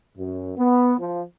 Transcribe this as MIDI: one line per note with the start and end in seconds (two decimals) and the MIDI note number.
0.18 0.51 42
0.57 0.94 59
0.99 1.22 53